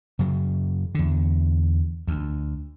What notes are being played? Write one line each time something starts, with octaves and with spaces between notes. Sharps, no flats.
F#2 C#3 F#3
E2 D3
D2